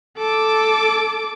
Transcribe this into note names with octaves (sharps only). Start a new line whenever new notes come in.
A4 D6